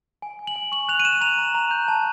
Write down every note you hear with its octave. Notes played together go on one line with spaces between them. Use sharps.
G#5
G#5
F#7
G#5
C#6 F#7
F#6 F7
D#7
F#6 E7
A#5 F7
A#5
A#5
G6
A5